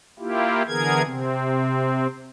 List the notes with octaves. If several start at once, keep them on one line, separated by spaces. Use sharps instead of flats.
A#3 E4 F4 G4
D3 E3 B3 G#4 A#4 G#6
C3 C4